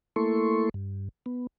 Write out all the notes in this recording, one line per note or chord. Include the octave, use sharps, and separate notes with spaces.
A3 A#3 E4 A4 C6 C#6
G2
B3